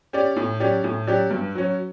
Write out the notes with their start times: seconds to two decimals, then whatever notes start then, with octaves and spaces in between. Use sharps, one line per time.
0.13 C#4 G4 D5
0.37 A2
0.60 F#3 C#4 G4 D5
0.84 A2
1.07 F#3 C#4 G4 D5
1.31 G2
1.55 F#3 C#4